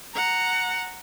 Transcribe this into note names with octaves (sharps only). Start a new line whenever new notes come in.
F#5 A#5